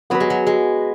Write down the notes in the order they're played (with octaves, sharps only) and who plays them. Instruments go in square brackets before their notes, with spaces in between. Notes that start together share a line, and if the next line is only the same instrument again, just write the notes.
[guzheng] F#3 [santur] B3 F#4 B4
[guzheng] G#3
F#3
G#3